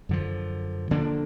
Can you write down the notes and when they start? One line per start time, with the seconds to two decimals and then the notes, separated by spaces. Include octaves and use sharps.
0.09 F#2 D3 F3
0.91 D3 F3 A#3 D4